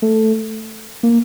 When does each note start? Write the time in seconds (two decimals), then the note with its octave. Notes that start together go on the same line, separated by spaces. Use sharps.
0.02 A3
1.03 A#3